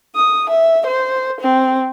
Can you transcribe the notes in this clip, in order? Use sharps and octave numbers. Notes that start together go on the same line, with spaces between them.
D#6
E5
C5
C4